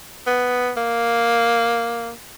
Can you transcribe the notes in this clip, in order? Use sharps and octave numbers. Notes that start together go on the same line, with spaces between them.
B3
A#3